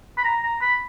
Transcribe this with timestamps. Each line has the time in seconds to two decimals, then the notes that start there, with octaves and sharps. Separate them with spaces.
0.18 B5
0.25 A#5
0.43 A#5
0.61 B5